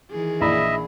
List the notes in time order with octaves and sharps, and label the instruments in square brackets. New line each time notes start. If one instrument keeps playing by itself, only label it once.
[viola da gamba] D#3 E3 G#4
[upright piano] A#1 E4 B5 [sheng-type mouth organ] D#5 E5